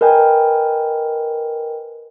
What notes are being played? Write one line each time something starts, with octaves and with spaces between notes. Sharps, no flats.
A#4 B4 D#5 G5 G#5